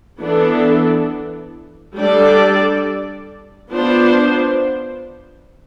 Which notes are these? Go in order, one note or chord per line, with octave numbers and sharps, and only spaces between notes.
E3 B3 D4 A4
G3 D4 A4 D5
B3 D4 F4 C5